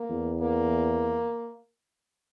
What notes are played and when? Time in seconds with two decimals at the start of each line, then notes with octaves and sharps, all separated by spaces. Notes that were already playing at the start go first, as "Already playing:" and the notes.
Already playing: A#3
0.10 E2
0.40 A#3